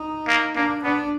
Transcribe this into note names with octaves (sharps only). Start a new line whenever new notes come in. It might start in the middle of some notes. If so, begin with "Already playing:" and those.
Already playing: D#4
A#3
A#3 D4
B3 D4